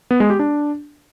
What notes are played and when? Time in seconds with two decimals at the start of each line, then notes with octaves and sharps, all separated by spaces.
0.11 B3
0.20 G#3
0.30 G4
0.39 D4